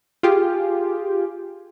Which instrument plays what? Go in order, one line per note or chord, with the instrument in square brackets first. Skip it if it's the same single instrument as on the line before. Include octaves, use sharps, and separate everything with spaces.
[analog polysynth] F4 G4 G#4